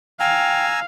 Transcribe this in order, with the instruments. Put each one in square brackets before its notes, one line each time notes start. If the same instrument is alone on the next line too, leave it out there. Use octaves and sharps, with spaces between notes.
[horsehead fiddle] F5 [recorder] G5 [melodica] G#5 A#5 E6